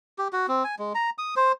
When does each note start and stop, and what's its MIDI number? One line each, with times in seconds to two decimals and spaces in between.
0.18 0.28 67
0.33 0.46 66
0.48 0.64 60
0.64 0.75 80
0.79 0.93 56
0.95 1.10 82
1.18 1.34 87
1.36 1.52 72